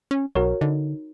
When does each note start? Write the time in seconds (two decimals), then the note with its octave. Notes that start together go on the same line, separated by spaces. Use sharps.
0.11 C#4
0.35 B1 F#4 A#4 C#5
0.61 D3 D#4